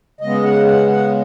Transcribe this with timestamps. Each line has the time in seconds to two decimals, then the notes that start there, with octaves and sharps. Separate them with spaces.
0.21 C#3 G#3 B3 D#5
0.44 F#5
0.66 F#5
0.88 F#5